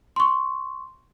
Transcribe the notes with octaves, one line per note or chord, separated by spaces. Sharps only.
C6 C#6